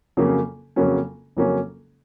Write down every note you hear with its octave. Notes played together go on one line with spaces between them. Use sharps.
F2 C#3 F#3 A#3 C#4
F2 C#3 F#3 A#3 C#4
F2 C#3 F#3 A#3 C#4